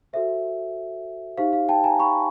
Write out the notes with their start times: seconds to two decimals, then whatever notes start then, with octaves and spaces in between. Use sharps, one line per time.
0.13 F#4 A4 C5 E5
1.37 D#4 G4 C5 F5
1.53 F5
1.69 G5 A5
1.84 G#5 A#5
1.99 B5 C#6